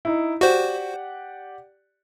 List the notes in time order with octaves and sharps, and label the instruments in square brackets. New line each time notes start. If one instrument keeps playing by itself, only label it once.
[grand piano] D#4 E4
[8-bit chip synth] F#4 C5 [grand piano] G4 D5 F#5